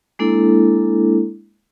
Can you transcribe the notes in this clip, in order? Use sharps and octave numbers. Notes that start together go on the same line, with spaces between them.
G#3 A#3 D4 E4 A4